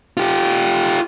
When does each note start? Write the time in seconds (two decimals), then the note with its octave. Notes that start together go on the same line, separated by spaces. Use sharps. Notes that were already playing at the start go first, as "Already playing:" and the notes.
0.17 F4 G4